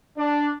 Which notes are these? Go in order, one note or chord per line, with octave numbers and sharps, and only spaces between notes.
D4